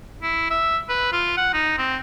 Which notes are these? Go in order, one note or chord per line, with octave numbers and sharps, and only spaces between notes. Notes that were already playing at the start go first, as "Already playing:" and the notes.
E4
E5
B4
F4
F#5
D#4
C4